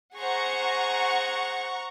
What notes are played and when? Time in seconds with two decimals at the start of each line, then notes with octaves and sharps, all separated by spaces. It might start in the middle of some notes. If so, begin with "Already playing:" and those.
0.17 G#4 C5 F#5 A#5 C#6